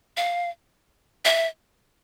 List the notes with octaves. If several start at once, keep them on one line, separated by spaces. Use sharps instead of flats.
F5
E5